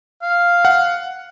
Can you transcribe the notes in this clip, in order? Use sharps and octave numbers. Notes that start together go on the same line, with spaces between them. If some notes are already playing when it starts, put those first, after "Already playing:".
F5
F#5